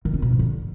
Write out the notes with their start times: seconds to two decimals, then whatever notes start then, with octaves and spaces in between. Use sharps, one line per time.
0.05 D#3
0.14 C#4
0.22 B2
0.31 G#2
0.39 D3